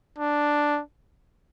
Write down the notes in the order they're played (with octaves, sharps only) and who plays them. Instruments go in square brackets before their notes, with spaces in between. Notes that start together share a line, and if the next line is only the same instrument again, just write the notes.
[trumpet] D4